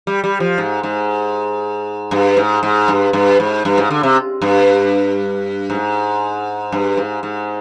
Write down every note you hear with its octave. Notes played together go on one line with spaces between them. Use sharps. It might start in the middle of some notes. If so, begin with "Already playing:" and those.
G3
G3
F3
G#2
G#2
G2
G#2
G#2
G2
G2
G#2
G2
G#2
D3
C3
G2
G#2
G2
G#2
G#2